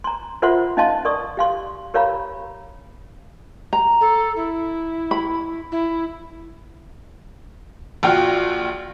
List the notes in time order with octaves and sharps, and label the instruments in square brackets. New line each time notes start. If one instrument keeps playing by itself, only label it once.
[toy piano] A#5 C6
F4 A#4 C5 E5 F#5 C6
C#4 D#4 D#5 F5 A5 C6
A#4 D5 C#6 D#6
G4 F5 C6
G4 A#4 C#5 F5 A#5 B5
[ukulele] A#5
[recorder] A4
E4
[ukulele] B5
[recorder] E4
[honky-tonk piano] A#1 F4 F#4 G5 F6